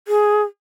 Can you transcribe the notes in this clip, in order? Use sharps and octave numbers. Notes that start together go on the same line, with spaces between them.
G#4